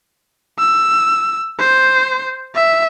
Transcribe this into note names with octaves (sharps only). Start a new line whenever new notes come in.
E6
C5
E5